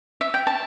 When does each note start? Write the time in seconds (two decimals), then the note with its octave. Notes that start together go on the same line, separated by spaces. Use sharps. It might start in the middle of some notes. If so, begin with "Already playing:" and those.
0.21 E5
0.34 G5
0.47 A5